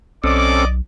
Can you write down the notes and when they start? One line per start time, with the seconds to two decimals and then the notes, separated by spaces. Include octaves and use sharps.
0.24 B1 C4 C#4 A4 D5 D#5 D6